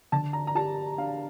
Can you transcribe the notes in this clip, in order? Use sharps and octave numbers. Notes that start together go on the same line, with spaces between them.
D3 A5
A#5
A#5
G4 A5
D4 F5